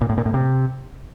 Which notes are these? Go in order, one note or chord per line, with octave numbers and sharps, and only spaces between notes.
A#2
A2
A#2
A2
C3